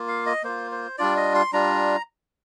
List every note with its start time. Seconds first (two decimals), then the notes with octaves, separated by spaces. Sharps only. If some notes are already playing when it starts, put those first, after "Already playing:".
Already playing: A#3 F4
0.08 F5
0.26 D#5
0.43 A#3 F4 C5
0.72 C5
0.98 G3 D4 F4 D5
1.17 D#5
1.35 C6
1.53 G3 D4 F4 A#5